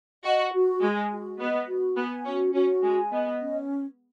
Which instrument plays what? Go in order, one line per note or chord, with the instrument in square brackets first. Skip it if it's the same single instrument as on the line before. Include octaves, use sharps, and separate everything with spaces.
[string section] F#4 [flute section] D#5
[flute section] F#4
[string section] G#3 [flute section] G#5
[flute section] F#4
[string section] B3 [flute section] D#5
[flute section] F#4
[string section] B3 [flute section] G#5
[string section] C#4 [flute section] F#4
[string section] C#4 [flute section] F#4
[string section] G#3 [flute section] G#5
[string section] B3 [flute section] D#5
[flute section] C#4